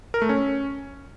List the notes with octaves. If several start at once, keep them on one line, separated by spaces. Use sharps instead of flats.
A#4
A3
C#4